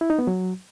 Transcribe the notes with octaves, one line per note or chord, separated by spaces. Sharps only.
E4
D#4
B3
F#3